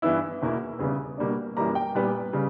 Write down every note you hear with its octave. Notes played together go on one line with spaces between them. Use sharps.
G2 E3 B3 E4 E6
E2 B2 A#3 E4
E2 C#3 G3 B3
B2 G3 A#3 D4
F#2 E3 G3 A#3 A#5
G5
A#2 G3 B3 B4
C#3 G3